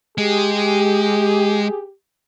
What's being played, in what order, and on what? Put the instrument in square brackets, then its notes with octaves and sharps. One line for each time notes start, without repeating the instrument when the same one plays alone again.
[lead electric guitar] G#3 [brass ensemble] G4 [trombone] G#4